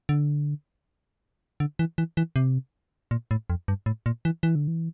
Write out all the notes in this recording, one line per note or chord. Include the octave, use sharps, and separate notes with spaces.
D3
D3
E3
E3
E3
C3
A#2
A2
F2
G2
A2
A#2
E3
E3
D3
E3